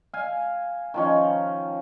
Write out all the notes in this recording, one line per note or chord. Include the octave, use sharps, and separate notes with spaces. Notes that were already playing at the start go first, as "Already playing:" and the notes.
F5 G#5
D#3 F3 C#4